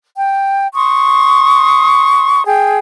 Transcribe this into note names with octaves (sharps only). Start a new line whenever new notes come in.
G5
C6 C#6 D#6
G#4 G5